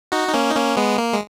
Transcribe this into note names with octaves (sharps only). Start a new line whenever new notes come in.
D#4 F#4
D#4
A#3 C#4
D#4
A#3 C#4
G#3 B3
A#3
G#3